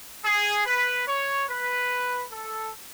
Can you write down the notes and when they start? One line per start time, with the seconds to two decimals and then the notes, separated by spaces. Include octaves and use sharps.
0.24 G#4
0.66 B4
1.06 C#5
1.48 B4
2.32 A4